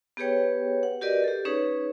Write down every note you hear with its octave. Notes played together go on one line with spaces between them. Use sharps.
B3 G4 G#4 B4 C#5 G5
F#5
F#4 G4 A#4 B4 D5 D#5
G4 A4
C#4 D#4 G#4 B4 C#5